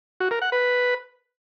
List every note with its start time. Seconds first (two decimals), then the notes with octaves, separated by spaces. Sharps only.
0.20 F#4
0.31 A#4
0.42 F#5
0.52 B4